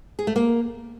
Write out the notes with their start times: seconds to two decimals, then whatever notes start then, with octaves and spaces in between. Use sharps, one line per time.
0.19 G#4
0.27 A3
0.36 A#3